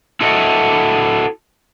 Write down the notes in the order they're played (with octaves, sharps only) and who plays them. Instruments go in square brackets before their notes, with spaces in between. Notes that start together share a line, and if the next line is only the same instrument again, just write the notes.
[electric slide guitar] E4 F#4 A4 D#5